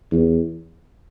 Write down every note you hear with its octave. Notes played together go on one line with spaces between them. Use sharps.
E2